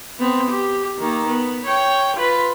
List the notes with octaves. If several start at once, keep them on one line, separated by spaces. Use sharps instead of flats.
B3 C4
G4
D#3 A#3
B3
C#5 G5
F4 B4